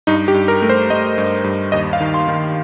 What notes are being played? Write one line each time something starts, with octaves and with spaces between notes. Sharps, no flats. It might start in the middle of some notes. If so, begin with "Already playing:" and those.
G2 D#4
G4
G2
A#4
A3
C5
A3 D#5
G2
G2
D#2 D#5
F5
D#3
C6
D#3